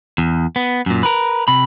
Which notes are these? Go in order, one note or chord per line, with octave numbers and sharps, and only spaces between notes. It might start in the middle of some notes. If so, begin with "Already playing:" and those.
E2
B3
F#2 A#2
A#4 B4
C3 B5